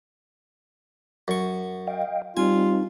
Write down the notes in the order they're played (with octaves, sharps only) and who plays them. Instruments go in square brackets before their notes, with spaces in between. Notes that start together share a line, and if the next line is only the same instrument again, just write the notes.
[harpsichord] F#2 C#6
[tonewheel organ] D#5 F5 G5
[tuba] G3 [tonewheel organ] C4 D#4 [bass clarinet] F4 [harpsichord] G#5